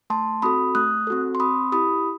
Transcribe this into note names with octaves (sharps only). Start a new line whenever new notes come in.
A3 A5 C6
C4 F#4 A4 B5 D#6
A3 D#6 F#6
C4 F#4 A4
C6
C4 B5 D#6
E4 G4 B5 D#6